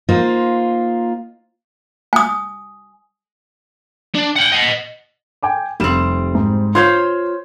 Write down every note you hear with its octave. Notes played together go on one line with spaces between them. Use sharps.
A#3 D#4 F4 C5
G#5 D#6
D4
F#5 G5
D#5 F#5
G5 G#5 D6
F1 G3 C4 E7
G#2
F4 C5 C#5 C6 G#6